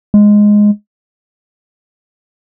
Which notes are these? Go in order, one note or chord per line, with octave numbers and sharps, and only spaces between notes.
G#3